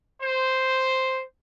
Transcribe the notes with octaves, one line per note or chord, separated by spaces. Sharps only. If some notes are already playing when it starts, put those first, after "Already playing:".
C5